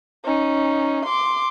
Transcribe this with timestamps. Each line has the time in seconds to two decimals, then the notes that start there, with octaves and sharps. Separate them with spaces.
0.24 C#4 D#4
1.06 C6 D6